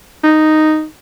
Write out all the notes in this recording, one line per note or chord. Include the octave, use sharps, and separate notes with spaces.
D#4